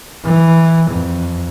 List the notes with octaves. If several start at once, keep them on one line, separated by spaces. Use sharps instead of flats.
E3
F2